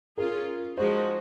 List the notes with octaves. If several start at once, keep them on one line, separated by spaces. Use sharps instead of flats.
C#4 F4 G#4 A#4
F3 G#3 D#4 F#4 C5